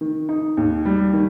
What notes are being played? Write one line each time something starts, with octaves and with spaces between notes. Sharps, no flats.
D#3
D#4
D#2
G3
D#3